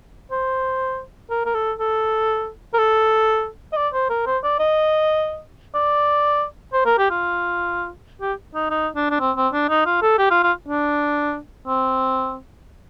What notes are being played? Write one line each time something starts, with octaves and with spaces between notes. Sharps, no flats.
C5
A#4
A#4
A4
A4
A#4
A4
D#5
D5
C5
A#4
C5
D5
D#5
D5
C5
A#4
G4
F4
G4
D#4
D#4
D4
D4
C4
C4
D4
D#4
F4
A4
G4
F4
F4
D4
C4